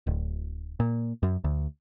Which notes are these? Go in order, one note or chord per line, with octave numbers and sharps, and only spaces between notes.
D1
A#2
F#2
D2